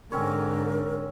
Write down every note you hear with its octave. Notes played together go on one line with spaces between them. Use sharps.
G#2 D3 C4 C#4 A#4 C#5